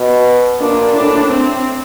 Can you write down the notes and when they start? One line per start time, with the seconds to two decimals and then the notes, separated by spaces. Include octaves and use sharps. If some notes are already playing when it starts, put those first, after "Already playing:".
Already playing: B2
0.60 A#2 D4
0.95 A2 D4
1.30 C4